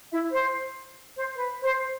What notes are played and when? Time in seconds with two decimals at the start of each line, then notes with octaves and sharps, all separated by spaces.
0.11 E4 E5
0.29 C5
1.18 C5
1.35 B4
1.62 C5